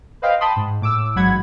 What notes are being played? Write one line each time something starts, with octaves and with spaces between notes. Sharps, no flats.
B4 C5 D#5 F5 G5
G5 A5 B5 C6 D#6
G#2
A2 D6 E6
A1 G#2 F#3 F#5 B5 G#6